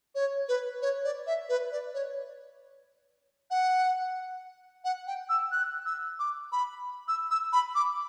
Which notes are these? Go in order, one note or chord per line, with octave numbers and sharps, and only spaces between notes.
C#5
B4
C#5
D5
E5
B4
D5
C#5
F#5
F#5
G5
E6
F#6
E6
D6
B5
E6
E6
B5
D6